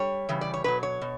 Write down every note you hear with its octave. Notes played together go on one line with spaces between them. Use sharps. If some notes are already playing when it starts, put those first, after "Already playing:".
Already playing: G3 C#5
C#3 E3 G3
D5
C#5
B2 F#3 B4
C#5
B2